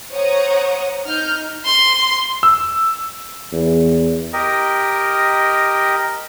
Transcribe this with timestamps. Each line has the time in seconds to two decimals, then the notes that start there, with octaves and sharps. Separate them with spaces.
0.12 C5 C#5 F#5 A#5 D#6
1.06 D#4 F6 G6
1.65 C6
2.43 E6
3.53 E2
4.33 G4 A#4 D#5